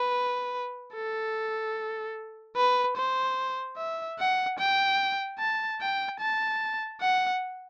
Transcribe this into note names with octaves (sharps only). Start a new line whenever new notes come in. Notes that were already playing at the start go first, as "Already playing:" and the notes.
Already playing: B4
A4
B4
C5
E5
F#5
G5
A5
G5
A5
F#5